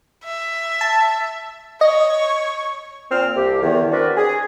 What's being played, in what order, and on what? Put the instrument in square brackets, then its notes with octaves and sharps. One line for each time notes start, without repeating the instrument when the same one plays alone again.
[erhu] E5
[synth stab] A5
[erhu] C#5 [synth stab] D#5
[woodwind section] A#2 C4 F6
C2 G4
E2 D#3
C4 D4 F#4 A#4 B4 D5
G#4